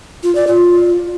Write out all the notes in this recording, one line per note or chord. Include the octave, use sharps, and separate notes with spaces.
F4
D5
F4